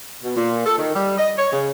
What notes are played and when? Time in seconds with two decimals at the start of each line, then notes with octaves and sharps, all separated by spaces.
0.24 B2
0.36 A#2
0.66 A4
0.78 D#3
0.95 G3
1.18 D#5
1.38 C#5
1.52 C#3